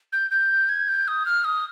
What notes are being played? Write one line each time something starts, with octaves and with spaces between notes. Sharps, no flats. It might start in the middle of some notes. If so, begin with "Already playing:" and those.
G6
G6
G#6
G6
D#6
F6
D#6